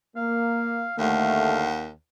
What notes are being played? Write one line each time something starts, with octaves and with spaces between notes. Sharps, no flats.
A#3 F5
D#2 D3 A3 F5 F#5